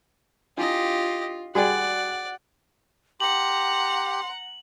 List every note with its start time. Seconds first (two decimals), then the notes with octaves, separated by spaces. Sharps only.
0.58 D4 E4 F4 G4 D#5
1.55 G3 F#4 G#4 D5 F#5 G5
3.20 G4 F#5 A#5 C6 F#7